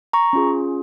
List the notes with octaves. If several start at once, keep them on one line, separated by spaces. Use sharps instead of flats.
A#5 C#6
C#4 F4 G#4